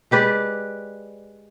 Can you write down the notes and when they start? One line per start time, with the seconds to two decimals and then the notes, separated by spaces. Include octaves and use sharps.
0.11 G#3 G4 B4 D5